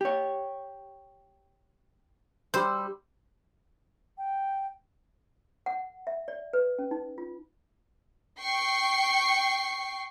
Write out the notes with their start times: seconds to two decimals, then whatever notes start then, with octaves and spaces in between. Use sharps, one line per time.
0.01 G4 C#5
2.54 G3 C5 E6
4.18 G5
5.66 F#5
6.07 E5
6.28 D5
6.53 B4
6.79 C#4
6.91 D#4
7.18 F4
8.40 G5 C#6 C7